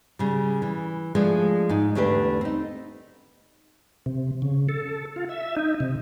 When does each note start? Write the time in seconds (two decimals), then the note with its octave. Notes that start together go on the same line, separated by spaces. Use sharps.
0.19 C#3 G3
0.62 E3
1.15 F3 G#3 A3 D4
1.69 G#2 D#4
1.95 E2 D3 A3 D4 G4 B4
2.41 C4 D#4
4.06 C3
4.42 C#3
4.69 A4
5.16 F4
5.29 E5
5.57 D#4
5.80 C3